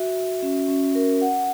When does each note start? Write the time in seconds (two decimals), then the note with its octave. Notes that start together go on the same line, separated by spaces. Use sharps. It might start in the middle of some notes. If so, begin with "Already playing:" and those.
Already playing: F#4 E5
0.16 F#4
0.42 C#4
0.69 C#4
0.95 A#4
1.21 F#5